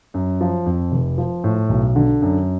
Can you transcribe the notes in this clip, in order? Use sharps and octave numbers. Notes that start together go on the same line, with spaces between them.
F#2
F3
F2
F1
F3
A2
B1
D3
F#2